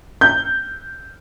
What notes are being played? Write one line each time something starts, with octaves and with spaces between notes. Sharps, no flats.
G6